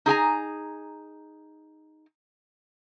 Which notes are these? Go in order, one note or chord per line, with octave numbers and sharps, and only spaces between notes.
D#4 G#4 G#5 A#5